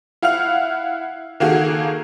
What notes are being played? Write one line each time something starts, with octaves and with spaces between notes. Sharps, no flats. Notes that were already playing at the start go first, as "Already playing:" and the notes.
E4 F5 F#5 F6 F7
D#3 A#3 F#4 G#4 A4